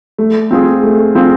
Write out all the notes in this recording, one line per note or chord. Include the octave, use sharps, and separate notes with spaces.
A3
C4 F4 G#4
A3
C4 F4 G#4